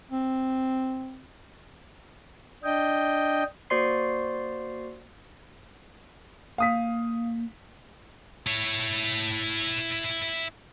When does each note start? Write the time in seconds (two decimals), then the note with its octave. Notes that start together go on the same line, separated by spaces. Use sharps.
0.11 C4
2.64 D4 D#5 G5
3.70 A#3 F#4 C5 D5 C6 C7
6.58 A#3 F5 D#6 B6
8.47 E4 C#5